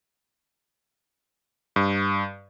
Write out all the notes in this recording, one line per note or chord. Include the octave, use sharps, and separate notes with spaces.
G2